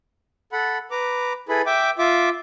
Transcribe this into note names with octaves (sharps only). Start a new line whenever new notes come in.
A4 F#5 B5
B4 A#5 D6
E4 G#4 A4 B4 B5
E5 G5 D6
F4 E5 D6